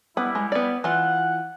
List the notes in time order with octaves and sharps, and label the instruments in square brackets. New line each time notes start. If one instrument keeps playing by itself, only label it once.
[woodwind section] G3 E4 [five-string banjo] B3
[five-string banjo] G#3
B3 D5
[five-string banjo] E3 F4 [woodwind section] F#5